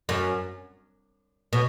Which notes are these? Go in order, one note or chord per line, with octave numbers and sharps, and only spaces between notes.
F#2
B2